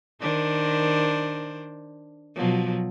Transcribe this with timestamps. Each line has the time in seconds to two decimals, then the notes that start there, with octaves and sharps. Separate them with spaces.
0.21 D#3 D4 C5
2.35 B2 F3 F#3